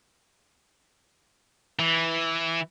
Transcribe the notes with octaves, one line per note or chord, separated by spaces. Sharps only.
E3